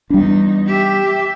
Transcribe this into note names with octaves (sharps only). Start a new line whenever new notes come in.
E2 G3 D4 D#4
G4 E5